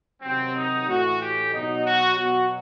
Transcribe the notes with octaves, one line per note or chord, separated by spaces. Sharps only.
C3 D#3 F#3 C4
D#4
A2 E3 F#4
G4
B2 F#3 D#4
F#4
B2 F#3 F#4